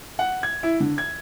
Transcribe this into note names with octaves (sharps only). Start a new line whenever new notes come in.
F#5
G#6
E4
D3
G#6